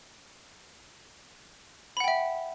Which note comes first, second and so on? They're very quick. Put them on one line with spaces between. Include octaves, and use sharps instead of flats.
B5 F#5 G5 E5